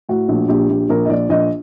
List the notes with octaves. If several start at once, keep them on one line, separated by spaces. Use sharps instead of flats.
A2 F#4
A#1
A#1 G4
A#1
A#1 A#4
D#5
A#1 D5
A#1 D#5